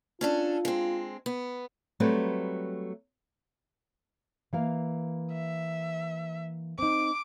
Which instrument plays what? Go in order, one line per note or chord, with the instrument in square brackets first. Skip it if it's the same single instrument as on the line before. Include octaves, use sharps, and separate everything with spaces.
[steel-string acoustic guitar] C#4 D4 A4 [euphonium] F4
[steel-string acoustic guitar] G#3 C4
B3
[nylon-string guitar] F#3 G3 A3 C4 G4 B4
E3 A#3 F5
[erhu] E5
[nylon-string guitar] C4 D#4 [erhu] D6